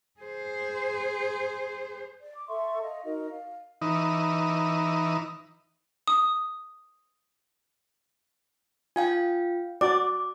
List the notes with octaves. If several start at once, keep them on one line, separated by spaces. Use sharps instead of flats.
G#4 C5
D5
D6
A4 E5 C6 C#6
D#5 F5
D#4 F#4 A#4 D#5
F5
E3 D#4
D#6
F4 F5 G5 G#5
F#4 D5 D6